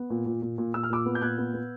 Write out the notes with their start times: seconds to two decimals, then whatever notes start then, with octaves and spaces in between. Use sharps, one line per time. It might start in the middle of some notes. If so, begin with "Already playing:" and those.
Already playing: B3
0.10 A#2
0.26 A#2
0.42 A#2
0.58 A#2
0.74 A#2 E6
0.83 F6
0.90 A#2 D6 E6
1.06 B3
1.15 G6
1.22 A#2 F#6 G#6
1.38 B3
1.54 B3